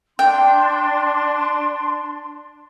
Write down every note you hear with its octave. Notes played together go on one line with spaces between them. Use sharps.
D4 G5 C6